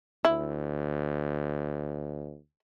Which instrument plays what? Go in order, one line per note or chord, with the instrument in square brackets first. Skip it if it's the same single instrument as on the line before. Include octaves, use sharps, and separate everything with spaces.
[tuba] D2 [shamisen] E4